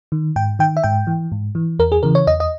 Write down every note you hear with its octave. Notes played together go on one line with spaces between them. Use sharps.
D#3
G#2 G5
D#3 G5
E5
G#2 G5
E3
G#2
E3
E2 A#4
G#4
C#3 E3 A#4
C#5
E2 D#5
D#5